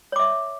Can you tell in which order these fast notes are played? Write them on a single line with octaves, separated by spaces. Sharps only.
C#5 D6 E5